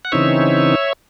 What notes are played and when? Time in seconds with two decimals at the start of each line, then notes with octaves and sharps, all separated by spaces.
0.05 F#5
0.12 C#3 E3 C4 D#4 C#5 E5